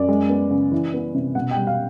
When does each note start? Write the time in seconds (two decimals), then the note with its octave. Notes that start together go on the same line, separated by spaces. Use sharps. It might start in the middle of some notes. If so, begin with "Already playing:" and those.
Already playing: F#2 D5
0.09 G#3
0.29 B3
0.50 C#3
0.72 E3
0.94 B3
1.15 C3
1.35 B2 F#5
1.51 G5
1.57 G3
1.67 F5